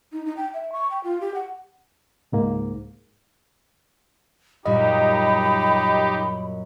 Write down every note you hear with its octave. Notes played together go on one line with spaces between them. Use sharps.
D#4
D#4
G5
E5
C#6
G5
F4
G4
F#5
C#2 G#2 A#3
F#2 A#2 G3 D#4 G4 D#5 B5